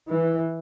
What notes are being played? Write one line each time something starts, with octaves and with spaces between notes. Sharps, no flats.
E3